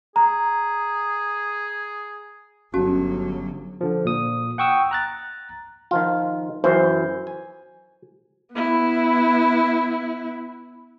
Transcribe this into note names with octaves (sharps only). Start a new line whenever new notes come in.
G#4 A#5
G1 F#3 C#4 F#4 A5
D3 F3
A#2 D#6
F#5 G5 C#6 D#6 E6
A#5 F#6 A6
D#3 F3 F4
F#2 E3 C5
G#5
B3 E4